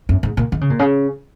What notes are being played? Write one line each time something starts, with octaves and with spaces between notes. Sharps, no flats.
F#2
G#2
A#2
D#3
C#3
A#2
C#3